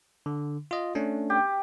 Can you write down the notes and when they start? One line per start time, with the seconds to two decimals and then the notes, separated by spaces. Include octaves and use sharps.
0.26 D3
0.71 F4 D#5
0.95 A3 C#4 D4
1.30 G4